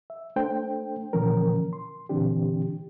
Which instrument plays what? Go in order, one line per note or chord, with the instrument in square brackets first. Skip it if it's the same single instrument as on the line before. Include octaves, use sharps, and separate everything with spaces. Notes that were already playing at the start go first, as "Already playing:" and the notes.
[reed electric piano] E5
A3 D4 A4 C5 G5
A#2 D3 E3 F3 C#4 A#4
C6
A#2 D3 E3 C4 D4 G4